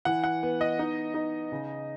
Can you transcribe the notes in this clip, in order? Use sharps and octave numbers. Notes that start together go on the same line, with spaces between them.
E3 F#5
F#5
B3
D#5
D#4
D#4
C#3